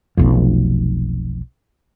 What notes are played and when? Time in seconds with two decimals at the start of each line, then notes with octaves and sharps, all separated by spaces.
0.17 F1 B1 F2